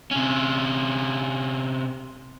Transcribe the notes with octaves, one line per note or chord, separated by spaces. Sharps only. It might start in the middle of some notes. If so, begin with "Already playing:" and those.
C3 C#4